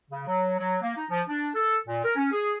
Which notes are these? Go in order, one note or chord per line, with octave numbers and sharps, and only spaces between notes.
C#3
F#3
F#3
A#3
D#4
F3
D4
A4
A#2
A#4
C#4
G#4